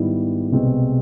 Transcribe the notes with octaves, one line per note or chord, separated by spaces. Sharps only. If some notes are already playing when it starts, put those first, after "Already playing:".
Already playing: G#2 D#3 G3 B3 E4
C2 B2 G#3 C4